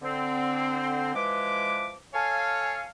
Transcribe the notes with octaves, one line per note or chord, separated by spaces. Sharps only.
D3 C4
E3 F3 G#3 B4 D6
A4 C#5 F5 G#5